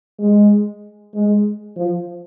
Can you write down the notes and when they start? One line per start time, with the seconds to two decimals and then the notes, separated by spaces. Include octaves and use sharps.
0.19 G#3
1.14 G#3
1.76 F3